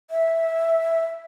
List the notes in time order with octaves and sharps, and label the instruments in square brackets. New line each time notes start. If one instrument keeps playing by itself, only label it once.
[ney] E5